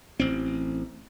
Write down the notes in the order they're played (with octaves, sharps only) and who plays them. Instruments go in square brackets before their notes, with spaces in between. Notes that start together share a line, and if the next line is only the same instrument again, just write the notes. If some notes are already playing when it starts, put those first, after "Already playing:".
[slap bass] A1 C4